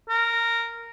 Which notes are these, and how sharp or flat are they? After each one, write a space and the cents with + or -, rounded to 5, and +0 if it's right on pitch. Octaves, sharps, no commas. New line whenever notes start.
A#4 -10